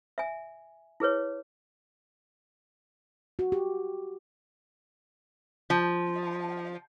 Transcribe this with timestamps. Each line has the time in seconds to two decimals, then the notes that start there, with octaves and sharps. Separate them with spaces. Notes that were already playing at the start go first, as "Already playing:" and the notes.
0.18 E5 G#5
1.00 E4 G#4 B4 C#5
3.39 F#4
3.52 G4
5.70 F3